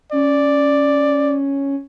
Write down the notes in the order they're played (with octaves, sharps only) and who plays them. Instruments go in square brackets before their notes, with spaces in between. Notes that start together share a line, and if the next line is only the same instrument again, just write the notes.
[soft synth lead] C#4 [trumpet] D5